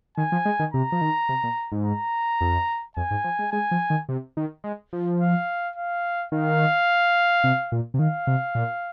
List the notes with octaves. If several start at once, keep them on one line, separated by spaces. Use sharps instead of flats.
D#3 G#5
F3
G#3
D#3
C3 A#5
F3
D#3
C3
A#2
G#2
A#5
F2
F2 G#5
G#2
F3
G#3
G#3 G#5
F3
D#3
C3
D#3
G#3
F3
F5
F5
D#3 F5
C3
A#2
C3
D#3 F5
C3
A#2